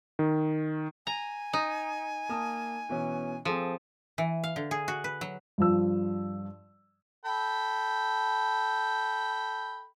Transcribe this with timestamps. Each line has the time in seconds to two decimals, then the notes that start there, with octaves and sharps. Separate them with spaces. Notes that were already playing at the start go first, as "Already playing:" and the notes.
0.19 D#3
1.07 G#5 A#5
1.53 D#4
2.29 A#3 A5 D#6
2.89 B2 E3 C#4
3.45 F3 C4 G#4 A4
4.18 E3
4.44 F5
4.56 D3
4.71 G#4
4.88 F#4
5.04 B4
5.21 F#3
5.58 G2 F3 E6
7.25 A4 G5 B5